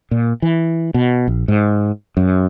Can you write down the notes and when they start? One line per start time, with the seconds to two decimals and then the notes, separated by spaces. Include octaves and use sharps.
0.11 A#2
0.42 E3
0.94 B2
1.28 A#1
1.48 G#2
2.17 F#2